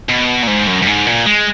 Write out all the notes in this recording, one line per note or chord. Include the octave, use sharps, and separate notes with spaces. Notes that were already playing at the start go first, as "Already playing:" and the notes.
B2
A#2
G#2
F#2
F#2
G#2
A#2
G#3